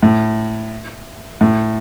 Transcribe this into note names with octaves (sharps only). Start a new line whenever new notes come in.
A2
A2